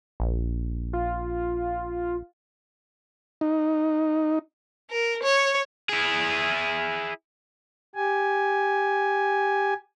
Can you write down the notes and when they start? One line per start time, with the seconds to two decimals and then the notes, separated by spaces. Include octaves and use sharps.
0.20 A#1
0.93 F4
3.41 D#4
4.91 A#4
5.23 C#5
5.89 E4 G#4
7.95 G4 G#5